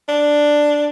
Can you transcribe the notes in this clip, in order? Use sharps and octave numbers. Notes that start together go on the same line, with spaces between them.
D4